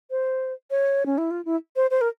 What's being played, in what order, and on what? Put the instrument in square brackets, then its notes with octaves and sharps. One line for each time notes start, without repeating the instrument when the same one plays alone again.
[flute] C5
C#5
C#4
E4
F4
E4
C5
C5
A#4